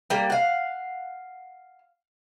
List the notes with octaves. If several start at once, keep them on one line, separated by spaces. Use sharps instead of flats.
G3 A#3
F5 F#5